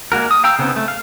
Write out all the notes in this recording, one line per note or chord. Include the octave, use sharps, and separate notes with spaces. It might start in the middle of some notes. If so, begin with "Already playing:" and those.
G#3 A#3 F#4 A#4
D#6
F5 G5 A#5 E6
C#3 B3 C4 D#4
A3
F5